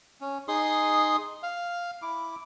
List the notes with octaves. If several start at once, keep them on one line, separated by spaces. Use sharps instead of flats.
C#4
D#4 G#4 C6 D#6
F5
E4 D6